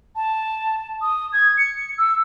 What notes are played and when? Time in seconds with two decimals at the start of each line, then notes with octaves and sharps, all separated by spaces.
0.16 A5
1.02 D#6
1.33 G#6
1.58 C#7
1.98 E6